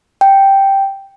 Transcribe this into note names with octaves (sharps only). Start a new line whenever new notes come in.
G5